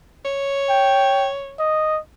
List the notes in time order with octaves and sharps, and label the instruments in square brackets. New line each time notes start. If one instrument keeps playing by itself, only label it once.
[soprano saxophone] C#5
[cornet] G5
D#5